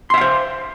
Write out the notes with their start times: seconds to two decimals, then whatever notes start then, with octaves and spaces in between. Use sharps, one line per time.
0.10 C6
0.14 E5
0.18 F5
0.21 C5